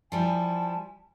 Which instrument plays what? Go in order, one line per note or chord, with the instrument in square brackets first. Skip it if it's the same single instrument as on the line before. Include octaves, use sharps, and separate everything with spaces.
[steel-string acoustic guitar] F3 G3 E4 [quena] G#5 [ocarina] A5